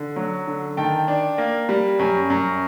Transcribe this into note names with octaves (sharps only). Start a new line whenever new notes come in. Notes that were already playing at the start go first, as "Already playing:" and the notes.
Already playing: D3
F#3
D3
D#3 G5 A5
D4
A#3
G3
F#2
F#2